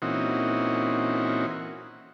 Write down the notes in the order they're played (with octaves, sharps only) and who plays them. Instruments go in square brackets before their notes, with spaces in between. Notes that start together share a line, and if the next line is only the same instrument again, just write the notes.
[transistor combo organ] A#2 E3 C4 C#4 D#4 F#4